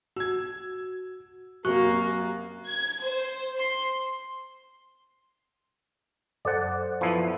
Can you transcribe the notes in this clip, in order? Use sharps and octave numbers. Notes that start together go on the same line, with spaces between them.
F#4 E6 G#6
F#2 C3 F#3 A#3 F#4 C#6 F#6
G#6
C5
C6
F#2 A4 C5 D5 F#5
F3 B3 E4